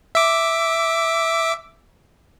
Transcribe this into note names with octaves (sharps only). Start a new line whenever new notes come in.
E5 D6